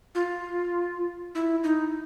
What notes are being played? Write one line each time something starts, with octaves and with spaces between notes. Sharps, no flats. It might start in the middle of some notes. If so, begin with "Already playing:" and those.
F4
E4
D#4